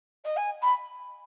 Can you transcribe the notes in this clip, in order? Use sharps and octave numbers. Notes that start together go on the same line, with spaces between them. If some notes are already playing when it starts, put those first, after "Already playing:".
D#5
G#5
B5